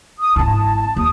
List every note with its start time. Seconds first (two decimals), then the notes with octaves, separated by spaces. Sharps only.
0.20 D#6
0.36 G#1 E4 A5
0.96 D#2 D#6